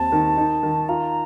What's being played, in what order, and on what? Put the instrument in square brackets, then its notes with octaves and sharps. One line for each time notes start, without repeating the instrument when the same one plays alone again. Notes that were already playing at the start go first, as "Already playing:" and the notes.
Already playing: [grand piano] D#2 C4 [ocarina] A5
[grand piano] D#3
D#4
D#3
[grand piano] F4 [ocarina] A#5